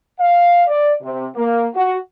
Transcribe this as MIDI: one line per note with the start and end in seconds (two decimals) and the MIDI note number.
0.20 0.63 77
0.67 0.94 74
1.02 1.27 48
1.36 1.65 58
1.75 1.96 66